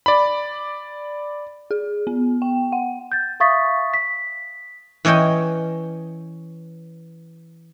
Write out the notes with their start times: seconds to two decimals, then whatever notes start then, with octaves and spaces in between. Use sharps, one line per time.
0.06 D5 B5
1.71 G#4
2.07 B3
2.42 G5
2.72 F#5
3.12 G6 A6
3.40 E5 F5 C#6 D#6 A6 B6
3.94 B6
5.05 E3 C#4 C#5 D#5 G5